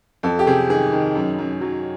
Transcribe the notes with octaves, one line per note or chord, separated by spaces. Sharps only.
F2 A4
G4
C3 G#4
D#3 G#4
D#3
F#2
F#2
F#3